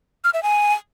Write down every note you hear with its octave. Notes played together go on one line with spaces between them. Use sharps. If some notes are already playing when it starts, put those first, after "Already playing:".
F6
E5
G#5